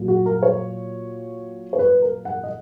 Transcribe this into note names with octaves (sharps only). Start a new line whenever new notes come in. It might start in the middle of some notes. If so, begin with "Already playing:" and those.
Already playing: A#2 F#3
F#4
A#4
C#5
C#5
B4
A#4
F#5
D#5